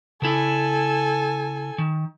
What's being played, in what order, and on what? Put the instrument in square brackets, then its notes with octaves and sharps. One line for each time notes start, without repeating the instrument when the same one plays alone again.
[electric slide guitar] C#3 E4 [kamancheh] A4 G#5
[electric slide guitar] D#3